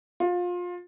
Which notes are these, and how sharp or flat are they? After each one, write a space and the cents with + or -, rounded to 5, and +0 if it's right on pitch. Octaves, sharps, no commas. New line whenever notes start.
F4 +25